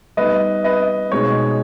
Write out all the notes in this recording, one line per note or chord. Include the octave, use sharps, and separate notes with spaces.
G3 B3 D#4 B4 D#5
B4 D#5
B2 G#3 D#4 C#5